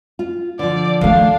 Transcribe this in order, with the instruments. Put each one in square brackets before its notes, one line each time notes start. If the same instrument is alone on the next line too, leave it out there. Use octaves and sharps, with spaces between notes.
[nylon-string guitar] F4
[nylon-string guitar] D3 F3 [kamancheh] D5
[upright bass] D#3 A3 [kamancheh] D4 F5